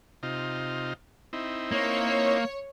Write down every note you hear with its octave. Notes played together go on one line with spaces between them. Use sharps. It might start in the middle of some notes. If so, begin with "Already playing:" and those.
C3 D#4 F4
C4 D#4 E4
A#3 C#5